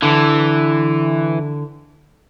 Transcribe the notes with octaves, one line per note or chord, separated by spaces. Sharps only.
D3 E3